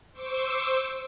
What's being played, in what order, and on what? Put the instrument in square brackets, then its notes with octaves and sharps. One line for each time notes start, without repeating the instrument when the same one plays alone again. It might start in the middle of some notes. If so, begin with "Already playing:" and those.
[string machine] C5 C#6 D6 E6